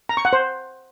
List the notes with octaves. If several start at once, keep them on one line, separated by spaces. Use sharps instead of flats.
A#5
C#6
F#5
C5